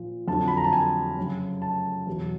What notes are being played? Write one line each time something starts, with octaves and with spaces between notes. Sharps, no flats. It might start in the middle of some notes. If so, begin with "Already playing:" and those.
Already playing: A#2 F3
F2 D3 F#3 A5
B5
A#5
A5
G#5
F#2 C#3 F#3
A5
E2 B2 F#3